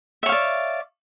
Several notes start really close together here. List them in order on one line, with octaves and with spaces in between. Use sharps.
E5 C#5 F5 D5